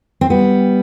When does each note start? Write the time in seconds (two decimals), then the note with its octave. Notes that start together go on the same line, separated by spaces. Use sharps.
0.21 C4
0.30 G3 B3